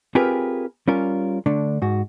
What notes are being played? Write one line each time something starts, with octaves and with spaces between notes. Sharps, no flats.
C4 F4 G4 G#4 A#4 B4
G3 C#4 F4 A#4
D3 A3 D4
G#2 F#4